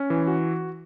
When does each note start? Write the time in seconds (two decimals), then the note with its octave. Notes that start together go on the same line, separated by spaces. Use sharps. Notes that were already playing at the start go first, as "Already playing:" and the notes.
Already playing: C#4
0.10 E3
0.27 F#4